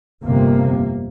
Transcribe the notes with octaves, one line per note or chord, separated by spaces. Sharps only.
G1 F2 C3 A#3